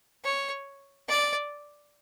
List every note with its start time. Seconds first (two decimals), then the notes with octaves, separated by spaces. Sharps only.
0.25 C#5
1.09 D5